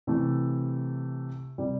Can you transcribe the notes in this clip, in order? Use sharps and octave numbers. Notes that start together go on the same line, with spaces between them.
C3 E3 A3
C3 G3